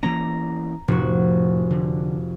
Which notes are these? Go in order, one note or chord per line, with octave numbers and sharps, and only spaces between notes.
E3 A#3 C#4 A#5
F1 A2 F#4
D3